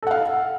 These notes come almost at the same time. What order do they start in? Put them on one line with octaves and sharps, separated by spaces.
A4 F#5 F5